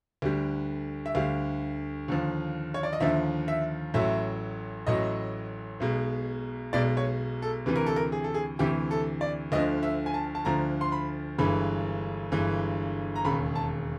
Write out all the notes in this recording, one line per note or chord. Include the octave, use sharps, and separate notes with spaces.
D2 D3 G3
E5
D2 D3 G3 F5
D#2 D3 F3
C#5
D5
D#5
D#2 D3 F3 E5
E5
A1 A2 F#3 E5
A1 A2 F#3 D#5
B1 B2 G#3
B1 B2 G#3 D5
C#5
A4
D2 C3 E3 B4
A#4
A4
A#4
G#4
A4
G#4
D2 C3 E3 G4
A4
D5
D2 D3 F3 D#5
E5
G#5
A5
A5
D2 D3 F3 A#5
C6
B5
G1 G2 E3 G#3 B5
G1 G2 E3 G#3
A#5
E1 D#2 C#3 B5
A5